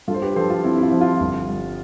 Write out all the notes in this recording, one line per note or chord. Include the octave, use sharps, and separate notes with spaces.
G2 F4 A4
C5
G4 B4
F3 A4 C5
F4
C4 E4
E4
F4
F3
F4
G1
G3